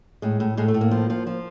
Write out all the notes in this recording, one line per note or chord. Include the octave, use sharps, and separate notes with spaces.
A2 G#3
A2
A2 G#3
A3
A2
A#3
F3
F3
F3